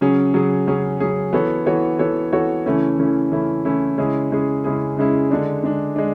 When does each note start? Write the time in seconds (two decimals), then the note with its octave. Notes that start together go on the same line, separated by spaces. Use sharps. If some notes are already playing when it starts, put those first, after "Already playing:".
0.01 C#3 F#3 C#4 G#4
0.34 C#3 F#3 C#4 G#4
0.67 C#3 F#3 C#4 G#4
1.00 C#3 F#3 C#4 G#4
1.33 E3 B3 F#4 A4 C#5
1.66 E3 B3 F#4 A4 C#5
1.99 E3 B3 F#4 A4 C#5
2.33 E3 B3 F#4 A4 C#5
2.65 C#3 E3 A3 C#4 E4
2.99 C#3 E3 A3 C#4 E4
3.32 C#3 E3 A3 C#4 E4
3.65 C#3 E3 A3 C#4 E4
3.98 C#3 G#3 C#4 E4 G#4
4.31 C#3 G#3 C#4 E4 G#4
4.64 C#3 G#3 C#4 E4 G#4
4.97 C#3 G#3 C#4 E4 G#4
5.31 D3 G#3 D4
5.64 D3 G#3 D4
5.96 G#3 D4